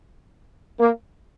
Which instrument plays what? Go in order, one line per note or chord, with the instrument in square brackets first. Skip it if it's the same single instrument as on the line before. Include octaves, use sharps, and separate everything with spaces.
[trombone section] A#3